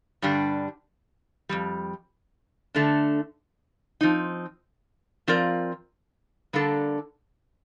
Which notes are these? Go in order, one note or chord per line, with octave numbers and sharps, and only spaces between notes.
G2 D3 G3 D4 G4
F2 C3 G3
D3 A3 D4
F3 C4 D#4
F3 C4 F4 A#4 D5
D3 G3 A#3 D4 A4